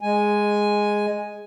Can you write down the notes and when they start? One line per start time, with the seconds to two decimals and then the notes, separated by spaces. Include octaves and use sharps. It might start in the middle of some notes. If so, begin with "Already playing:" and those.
0.01 G#3 G#5